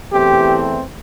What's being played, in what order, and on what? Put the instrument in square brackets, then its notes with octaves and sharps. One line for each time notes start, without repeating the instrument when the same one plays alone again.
[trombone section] E2 E3 A3 C4 G4